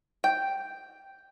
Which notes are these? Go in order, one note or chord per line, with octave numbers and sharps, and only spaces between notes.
G5